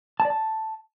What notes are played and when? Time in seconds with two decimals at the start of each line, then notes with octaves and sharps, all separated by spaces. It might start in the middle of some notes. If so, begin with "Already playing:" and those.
0.20 A5
0.25 D5
0.30 A5